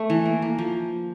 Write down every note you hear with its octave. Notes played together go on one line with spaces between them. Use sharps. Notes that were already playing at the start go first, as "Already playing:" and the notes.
Already playing: A3 E5
E3
A#3
A#3
F3